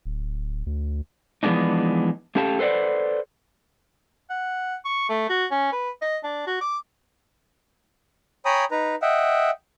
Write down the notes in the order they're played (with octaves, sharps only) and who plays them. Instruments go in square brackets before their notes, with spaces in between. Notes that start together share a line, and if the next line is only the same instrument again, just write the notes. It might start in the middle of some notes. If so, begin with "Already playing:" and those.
[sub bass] D1
D2
[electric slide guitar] E3 F3 G#3 B3 D4 D#4
A3 C#4 G4 A4 F5 A5
A4 B4 C5 D5 F#5
[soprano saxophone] F#5
C#6
A3
F#4
C#4
B4
D#5
D4
F#4
D6
[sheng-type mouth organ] C#5 G5 G#5 A#5 B5 D#6
D#4 B4 A#5
D#5 E5 F#5 G5